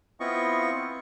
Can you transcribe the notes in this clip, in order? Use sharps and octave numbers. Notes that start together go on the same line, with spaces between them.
B3 C4 E4 F4 D#5 C#6